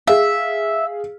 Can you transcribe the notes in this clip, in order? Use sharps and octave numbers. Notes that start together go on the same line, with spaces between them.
G#4 E5 F5